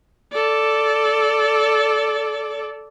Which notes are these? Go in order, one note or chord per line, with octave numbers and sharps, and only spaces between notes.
A4 D5